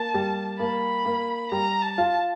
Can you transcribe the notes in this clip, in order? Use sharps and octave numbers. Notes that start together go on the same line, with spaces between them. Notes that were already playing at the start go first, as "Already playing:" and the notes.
Already playing: A#3 A5
G3
A#3 B5
A#3
G3 A#5
A5
F4